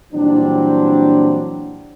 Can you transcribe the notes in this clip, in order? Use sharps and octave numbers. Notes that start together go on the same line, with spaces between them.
A#2 E3 F#3 G3 C4 D4